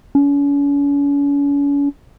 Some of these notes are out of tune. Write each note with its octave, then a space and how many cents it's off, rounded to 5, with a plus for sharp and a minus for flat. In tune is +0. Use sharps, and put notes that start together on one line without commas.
C#4 +40